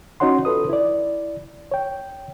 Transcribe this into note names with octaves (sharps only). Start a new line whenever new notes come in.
C#4 D#4 F#4 C#5 F#5 C6
F4 A4 B4 D#6
E4 D5
C#5 G5